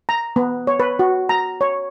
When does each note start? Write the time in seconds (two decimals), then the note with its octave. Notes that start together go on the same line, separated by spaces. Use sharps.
0.09 A#5
0.36 B3
0.67 C#5
0.80 B4
0.99 F#4
1.29 A#5
1.61 C#5